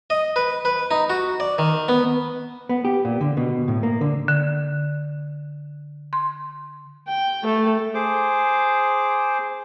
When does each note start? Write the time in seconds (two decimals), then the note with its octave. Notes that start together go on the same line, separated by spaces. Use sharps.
0.10 D#5
0.36 B4
0.65 B4
0.91 D#4
1.10 F#4
1.40 D5
1.59 D#3
1.89 B3
2.69 B3
2.85 G4
3.05 A#2
3.21 D3
3.37 B2
3.68 A2
3.83 A#3
4.01 D3
4.28 D3
6.13 C6
7.07 G5
7.44 A3 A4
7.94 G#4 C5 D6